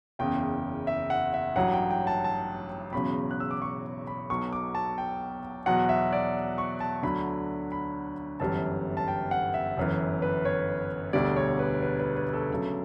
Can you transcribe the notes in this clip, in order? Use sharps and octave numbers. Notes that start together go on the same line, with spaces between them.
F#1 E2 C#3 G5
E5
F#5
E5
A1 G2 F#3 F#5
G5
G5
A5
A5
E1 E2 C#3 F#3 B5
F#6
E6
D6
C#6
B5
B1 B2 F#3 C#6
D6
A5
G5
E2 B2 F#3 F#5
E5
D5
C#6
A5
D2 D3 F#3 B5
B5
G1 F#2 E3 G3 A5
A5
G5
F#5
E5
G1 F#2 E3
B4
C#5
E1 D2 D3 G3 D5
C#5
B4
B4
B4
B4
A4
D2 C#3 F#3